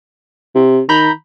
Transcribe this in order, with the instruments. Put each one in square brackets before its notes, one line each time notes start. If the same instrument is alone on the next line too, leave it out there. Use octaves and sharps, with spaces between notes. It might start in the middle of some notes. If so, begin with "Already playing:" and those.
[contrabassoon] C3
[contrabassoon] D#3 [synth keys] A#5 B5 G6